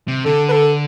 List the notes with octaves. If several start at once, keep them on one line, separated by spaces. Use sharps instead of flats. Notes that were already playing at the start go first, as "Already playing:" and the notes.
C3
D3 A4
B4
A4